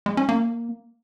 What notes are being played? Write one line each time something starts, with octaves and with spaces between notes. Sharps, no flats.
G#3
C#4
A#3